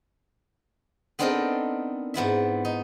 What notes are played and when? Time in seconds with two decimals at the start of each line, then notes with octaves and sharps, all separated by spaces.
1.19 B3 C4 D4 D#4 A4 A#4
2.14 G#2 B3 E4 E5
2.65 D#4